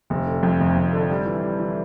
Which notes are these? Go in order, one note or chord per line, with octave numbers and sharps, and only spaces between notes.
F1
D3
F2
F1
F1
D3
G3
E3
G3
E3